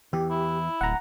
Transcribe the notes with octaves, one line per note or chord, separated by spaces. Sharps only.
E2 E3 G4
E4
D1 F#5 A#5